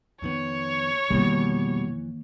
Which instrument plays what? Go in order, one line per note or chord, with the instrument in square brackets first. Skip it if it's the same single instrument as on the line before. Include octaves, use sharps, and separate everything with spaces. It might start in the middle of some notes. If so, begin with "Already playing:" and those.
[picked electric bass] F2 D#3 B3 [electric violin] C#5
[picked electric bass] F2 E3 [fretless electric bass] B2 G3 [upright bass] D#3 A#3